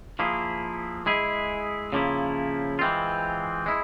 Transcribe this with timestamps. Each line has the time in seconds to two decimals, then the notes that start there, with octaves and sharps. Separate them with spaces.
0.19 F3 A#3 E4 G#4
1.06 G#3 E4 G#4
1.93 C#3 F3 A#3 E4
2.79 E3 G#3 C4 F4
3.66 G#3 E4